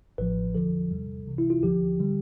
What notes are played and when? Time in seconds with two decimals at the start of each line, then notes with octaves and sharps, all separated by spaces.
0.18 A1 A2 F3 B4
0.55 F2 D3 F3 A4
0.91 E2 C3 G3
1.27 C2 C3 E3
1.38 E4
1.50 F4
1.63 D2 D3 F3 G4
2.00 D3 G3